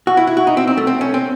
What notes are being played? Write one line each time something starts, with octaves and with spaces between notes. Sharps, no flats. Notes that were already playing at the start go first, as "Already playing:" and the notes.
F#4
E4
E4
F#4
D#4
C4
C4
A3
C4
C#4
C4